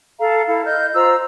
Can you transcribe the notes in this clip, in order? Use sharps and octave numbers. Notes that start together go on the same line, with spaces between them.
A4 F5 A#5
E4 A4 F5
D#5 F6 G6
F4 C5 A#5 E6